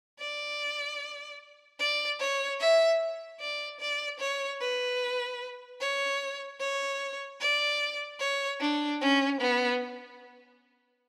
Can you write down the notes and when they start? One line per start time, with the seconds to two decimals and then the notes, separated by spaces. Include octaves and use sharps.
0.20 D5
1.79 D5
2.20 C#5
2.60 E5
3.40 D5
3.80 D5
4.19 C#5
4.61 B4
5.81 C#5
6.60 C#5
7.41 D5
8.20 C#5
8.61 D4
9.01 C#4
9.40 B3